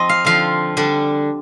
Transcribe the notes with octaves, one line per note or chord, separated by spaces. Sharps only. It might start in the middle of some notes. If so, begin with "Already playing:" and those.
Already playing: F3 C4 D#5
F5
D3 F3 C4 F5
D3 G3 D4